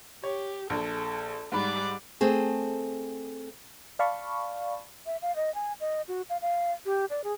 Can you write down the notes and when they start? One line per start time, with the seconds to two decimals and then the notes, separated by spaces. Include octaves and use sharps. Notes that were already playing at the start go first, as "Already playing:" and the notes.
0.24 G4 C#5
0.70 A#1 A4
1.52 G#2 G3 D5 B5
2.21 A3 C4 G#4
3.99 D5 F5 A5 B5 C#6
5.06 E5
5.22 F5
5.36 D#5
5.55 G#5
5.80 D#5
6.08 F#4
6.30 F5
6.42 F5
6.86 G4
7.10 D5
7.24 G#4